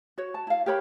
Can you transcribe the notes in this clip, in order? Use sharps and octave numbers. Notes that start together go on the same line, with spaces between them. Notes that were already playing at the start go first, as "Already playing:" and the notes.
F#4 C#5
A5
E4 F5
G4 A#4 C#5 B5